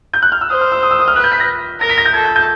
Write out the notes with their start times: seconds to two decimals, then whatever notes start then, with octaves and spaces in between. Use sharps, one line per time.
0.13 G6
0.22 F#6
0.32 F6
0.41 E6
0.50 C5 D#6
0.61 F6
0.72 E6
0.83 D#6
0.91 E6
0.99 D#6
1.08 F6
1.16 B4 F#6
1.24 G6
1.32 B6
1.40 A#6
1.80 A#4 A#6
1.89 B6
1.98 A#6
2.05 G6
2.14 A4 G#6
2.25 G6
2.36 G6